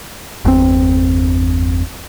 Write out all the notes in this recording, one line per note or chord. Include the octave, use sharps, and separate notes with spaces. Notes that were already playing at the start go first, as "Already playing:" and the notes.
G1 E2 C3 C4